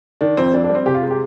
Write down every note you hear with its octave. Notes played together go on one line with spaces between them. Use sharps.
D#3 D4
F2 C4
F2 D4
D4
G3
C4
C3 G4
F4
G#3
G4